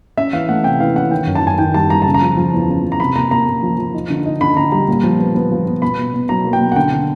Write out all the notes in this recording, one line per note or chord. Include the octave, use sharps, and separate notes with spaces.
C#4 E5
E3 F5
A3 F#5
C3 G5
E3 F5
C#4 F#5
D#3 G5
F#2
A5
F#2 G#5
D#3 G5
G3 A5
G3 A#5
C#3 A5
A#5
F3
F3
E2
C#3
F3
A#5
C3 B5
A#3 A#5
A#3 A#5
A#3
F3
F3
D#4
D3
D#4
D3 B5
D3 A#5
G3 A#5
A#2
F3
B3
B3
F3
B3
B2 B5
B2
B2
F#3 A#5
A#3
G5
B2
F#5
D3 G5
D3